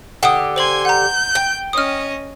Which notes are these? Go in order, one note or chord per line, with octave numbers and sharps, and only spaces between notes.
D3 G4 F#5 D#6
C5 G#5 C6 G#6 F#7
F#5 A#5 G6
G5
C#4 D#5 D#6 F6